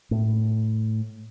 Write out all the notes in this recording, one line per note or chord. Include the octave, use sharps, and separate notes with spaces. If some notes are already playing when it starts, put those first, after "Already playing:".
A2